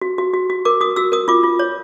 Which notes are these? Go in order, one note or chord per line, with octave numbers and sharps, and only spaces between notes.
F#4
F#4
F#4
F#4
A#4 D6
F#4 D#6
F#4 E6
A#4 D#6
F4 D6
F4
C#5